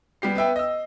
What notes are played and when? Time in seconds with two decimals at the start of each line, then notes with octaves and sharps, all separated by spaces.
0.22 G3 B3 G4 C7
0.35 B3 B4 E5 G5
0.56 D#5 E6